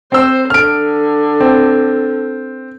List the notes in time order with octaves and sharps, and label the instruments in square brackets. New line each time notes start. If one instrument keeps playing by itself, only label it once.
[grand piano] C4 E6 [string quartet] C5
[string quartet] D3 [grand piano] F6 D7
[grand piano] C4